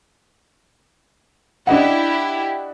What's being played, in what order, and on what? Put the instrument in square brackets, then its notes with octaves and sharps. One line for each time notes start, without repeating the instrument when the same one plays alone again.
[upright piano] D4 D#5 F#5 [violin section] E4 G4